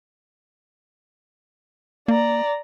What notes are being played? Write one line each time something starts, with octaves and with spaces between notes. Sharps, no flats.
A#3 D5 A#5